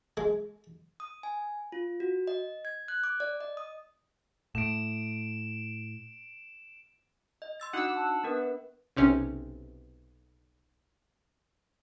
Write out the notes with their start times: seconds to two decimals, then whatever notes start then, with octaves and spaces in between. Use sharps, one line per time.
0.17 G#3
1.00 D#6
1.23 G#5
1.72 F4
2.00 F#4
2.27 D#5
2.65 G#6
2.88 F#6
3.04 D6
3.20 D5
3.41 D#5
3.57 D#6
4.55 A2 D7 E7
7.42 D#5
7.60 C6 E6 A6
7.73 D4 D#4 F#4 F#5 D6 E6
7.95 A5
8.23 B3 D4 A#4 B4
8.96 B1 C3 C#4